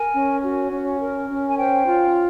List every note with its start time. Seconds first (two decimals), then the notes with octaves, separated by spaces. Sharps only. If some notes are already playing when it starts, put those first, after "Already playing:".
Already playing: A#4 G#5
0.13 C#4
0.42 F#4
0.71 C#4
1.00 A#4
1.29 C#4
1.49 G#5
1.58 C5 G5
1.87 F4